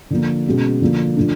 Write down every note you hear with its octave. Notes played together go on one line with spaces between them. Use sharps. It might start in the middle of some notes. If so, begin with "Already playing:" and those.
D3 F3 A#3
B2 G#3 C#4 F#4
D3 F3 A#3
D3 F3 A3 D4